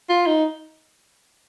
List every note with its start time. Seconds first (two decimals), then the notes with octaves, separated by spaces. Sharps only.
0.09 F4
0.27 D#4